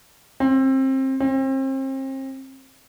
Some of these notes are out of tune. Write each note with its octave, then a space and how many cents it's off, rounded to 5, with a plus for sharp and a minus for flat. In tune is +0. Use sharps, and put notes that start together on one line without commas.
C4 +25
C4 +35